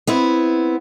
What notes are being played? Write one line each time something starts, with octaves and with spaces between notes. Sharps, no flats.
B3 C4 E4